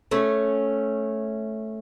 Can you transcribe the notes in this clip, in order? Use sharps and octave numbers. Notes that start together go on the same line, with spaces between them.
A3 C#4